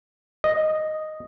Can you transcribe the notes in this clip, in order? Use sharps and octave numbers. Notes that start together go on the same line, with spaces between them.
D#5